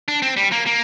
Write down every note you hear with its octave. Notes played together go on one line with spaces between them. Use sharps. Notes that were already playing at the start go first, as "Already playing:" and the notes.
D4
C4
G3
A#3
A#3